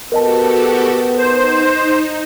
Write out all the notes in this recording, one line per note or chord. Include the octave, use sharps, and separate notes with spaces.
B3 F#4 G4 A4 A#4 D#5 A5
D#4 C5